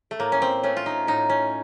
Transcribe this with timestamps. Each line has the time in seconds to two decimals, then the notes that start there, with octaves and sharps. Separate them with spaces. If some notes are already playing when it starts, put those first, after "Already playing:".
0.11 A3
0.19 A2 A#3
0.32 C#4
0.42 C4
0.63 A3 C#4
0.77 F4
0.86 D#4
1.07 A2 D#4
1.30 C#4